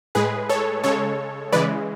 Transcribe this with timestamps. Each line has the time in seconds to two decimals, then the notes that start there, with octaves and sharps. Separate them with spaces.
0.15 A2 G#3 G#4 B4
0.49 A4 C#5
0.84 C#3 G#3 A4 C#5
1.52 C#3 E3 G#3 B4 D5